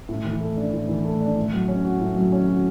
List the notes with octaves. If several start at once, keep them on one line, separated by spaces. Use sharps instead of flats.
A2
E3
A3
D4
A2
E3
A3
D4
A2
F#3
C#4
F#4
A2
F#3
C#4
F#4